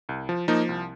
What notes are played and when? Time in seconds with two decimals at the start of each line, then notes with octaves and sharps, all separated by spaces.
0.09 C2
0.29 F3
0.48 F3 A#3 D#4
0.69 C2